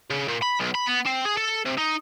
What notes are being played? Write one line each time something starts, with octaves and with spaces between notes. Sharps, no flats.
C#3
A#2
B5
B1
B5
B3
C4
G#4
A4
C3
D#4